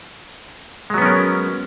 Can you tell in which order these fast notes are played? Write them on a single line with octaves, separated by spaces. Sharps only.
G#3 F#3 B3 C#4 A#4